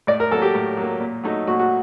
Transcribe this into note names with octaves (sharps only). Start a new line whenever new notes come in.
A2 D5
A#4
F#3 A#3 A4
G4
A2
F#3 A#3
A#2
F#3 A3 D#4
A#2 F#4
F#4